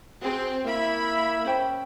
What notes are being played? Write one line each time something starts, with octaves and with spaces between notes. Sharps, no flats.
C4 F#4 G#4
A#3 E4 E5 B5
C#4 C5 G5